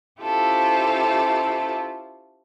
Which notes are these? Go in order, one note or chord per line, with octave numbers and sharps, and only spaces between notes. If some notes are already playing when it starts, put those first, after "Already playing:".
C#4 E4 F4 G4 A4 C5